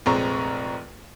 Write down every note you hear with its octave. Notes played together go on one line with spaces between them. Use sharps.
F1 A#1 G#3 C4 A#5 C#6